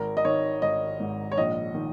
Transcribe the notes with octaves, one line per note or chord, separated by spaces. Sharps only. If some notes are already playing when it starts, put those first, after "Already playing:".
Already playing: G#1 A#4
D#5
D#3 C#5
G#1 D#5
G#2
C#5
A#1 D#5
D#3